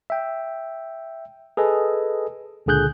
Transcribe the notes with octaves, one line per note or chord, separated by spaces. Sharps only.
E5 G5
G#4 A4 B4 D#5 G#5
C#2 A#2 D3 G#4 F#6 G6